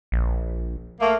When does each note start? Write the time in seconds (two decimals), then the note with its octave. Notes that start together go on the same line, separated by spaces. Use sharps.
0.12 A#1
1.00 A3 A#3